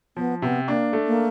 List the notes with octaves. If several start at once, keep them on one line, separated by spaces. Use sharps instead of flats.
F3 B3
C3 B3
A#3 D4
A3
A#3